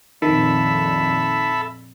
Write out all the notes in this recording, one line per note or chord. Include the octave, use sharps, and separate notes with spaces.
A#1 F2 D#3 A4 E5 B5